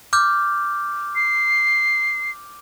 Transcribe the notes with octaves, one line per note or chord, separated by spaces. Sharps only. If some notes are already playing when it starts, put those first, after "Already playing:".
D6 F6 G6
C7